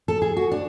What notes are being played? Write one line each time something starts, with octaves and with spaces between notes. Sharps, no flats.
A4
G#4
F#4
D4